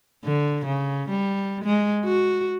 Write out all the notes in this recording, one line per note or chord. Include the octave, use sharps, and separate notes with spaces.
D3
C#3
G3
G#3
F#4